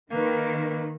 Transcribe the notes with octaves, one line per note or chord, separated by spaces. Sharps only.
D#3 A#3 B4